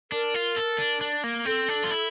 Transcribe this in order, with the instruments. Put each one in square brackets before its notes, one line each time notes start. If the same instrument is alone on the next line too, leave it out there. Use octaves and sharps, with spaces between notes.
[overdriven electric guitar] D4 [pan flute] A#4
[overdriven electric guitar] F4
A4
D4
D4
A#3
[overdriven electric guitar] C4 [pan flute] A4
[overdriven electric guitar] D4
F4
E4